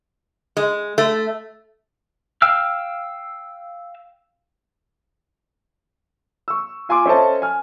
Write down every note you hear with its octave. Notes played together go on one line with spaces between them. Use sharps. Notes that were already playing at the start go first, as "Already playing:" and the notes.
G#3
A3
F5 G5 E6 F6
C#6 E6
F4 G#5 C6 D6
C#4 A4 C5 D#5 E5 A5
G#5 F6